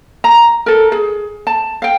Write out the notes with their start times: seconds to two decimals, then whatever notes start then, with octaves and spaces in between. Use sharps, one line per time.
0.24 A#5
0.66 A4 A#4
0.92 G#4
1.47 A5
1.82 F5 G5